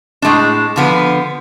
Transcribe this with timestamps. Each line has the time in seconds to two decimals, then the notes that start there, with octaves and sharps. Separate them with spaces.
0.22 A2 G#3 D4
0.76 D3 F3 B3